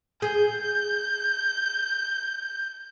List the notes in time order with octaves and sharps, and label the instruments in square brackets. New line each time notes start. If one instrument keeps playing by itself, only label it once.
[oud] G#4 [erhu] G6